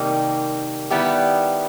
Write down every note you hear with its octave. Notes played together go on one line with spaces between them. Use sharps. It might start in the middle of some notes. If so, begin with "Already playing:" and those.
Already playing: C3 D#3 G3 A#3 D#4
D#3 G3 B3 E4 G4